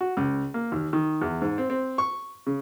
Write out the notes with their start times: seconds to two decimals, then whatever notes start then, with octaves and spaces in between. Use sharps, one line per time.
0.01 F#4
0.17 C#2
0.54 A#3
0.72 D#2
0.93 D#3
1.21 E2
1.42 G#2
1.58 C4
1.70 C4
1.98 C#6
2.47 C#3